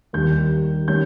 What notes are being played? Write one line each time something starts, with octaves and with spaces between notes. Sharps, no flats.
D#2 D#3 G3 G6
D#3 G3 C#4 G6